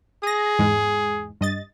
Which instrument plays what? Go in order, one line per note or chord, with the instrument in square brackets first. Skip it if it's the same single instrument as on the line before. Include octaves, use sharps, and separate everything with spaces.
[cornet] G#4 [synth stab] D#6 A#6
[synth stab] E2 G#2 G#3
G2 D#5 A6